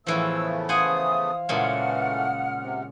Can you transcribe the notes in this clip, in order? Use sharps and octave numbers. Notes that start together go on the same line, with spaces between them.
A2 C#3 E3 F3 A3 B3 E6
C5 F5 F#5 G#5 D#6
A#2 C#3 E3 G#3 A3 F#5 F6
C3